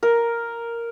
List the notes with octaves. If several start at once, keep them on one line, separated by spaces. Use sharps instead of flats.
A#4